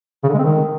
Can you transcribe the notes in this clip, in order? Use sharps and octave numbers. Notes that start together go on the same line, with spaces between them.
C#3
D3
G#3
C4
D#3